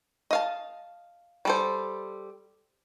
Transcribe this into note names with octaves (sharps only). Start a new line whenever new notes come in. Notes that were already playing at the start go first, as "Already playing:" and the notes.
D#5 F5 A5
G3 A4 C5